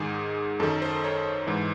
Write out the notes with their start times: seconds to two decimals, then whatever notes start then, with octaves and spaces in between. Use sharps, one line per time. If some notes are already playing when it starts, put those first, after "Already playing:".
Already playing: G#2 D#3 G#4
0.60 F#2 D#3 A4
0.82 C5
1.04 C#5
1.47 G#2 E3